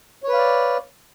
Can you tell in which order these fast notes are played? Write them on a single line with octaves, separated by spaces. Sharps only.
C#5 B4 F5 D5